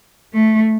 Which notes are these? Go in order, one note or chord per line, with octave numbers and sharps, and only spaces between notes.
A3